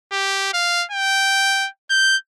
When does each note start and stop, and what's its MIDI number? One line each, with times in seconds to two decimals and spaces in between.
0.12 0.49 67
0.53 0.84 77
0.91 1.68 79
1.90 2.16 91